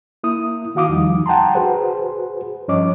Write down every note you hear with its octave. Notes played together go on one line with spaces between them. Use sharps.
A#3 E4 D#6
D#3 F#4 F5 D6 D#6
E2 D#3 F3 G3 D#4
F#5 G5 A5 A#5 C6
F#4 G#4 B4 C5
G2 F3 C#4 C#5 D#5 D6